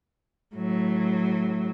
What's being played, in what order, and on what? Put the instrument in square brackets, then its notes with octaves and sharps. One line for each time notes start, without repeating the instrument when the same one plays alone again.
[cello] A2 F#3